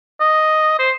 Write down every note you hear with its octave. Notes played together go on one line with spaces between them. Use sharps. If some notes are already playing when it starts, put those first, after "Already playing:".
D#5
C5